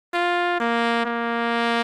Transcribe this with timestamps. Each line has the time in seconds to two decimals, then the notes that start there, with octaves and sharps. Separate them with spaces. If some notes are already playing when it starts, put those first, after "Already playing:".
0.14 F4
0.60 A#3
1.05 A#3